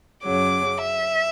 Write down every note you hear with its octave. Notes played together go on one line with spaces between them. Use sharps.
F#2 C#3 F#3 D6
E5